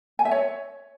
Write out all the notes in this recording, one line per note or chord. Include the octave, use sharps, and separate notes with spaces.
G#5
E5
C#5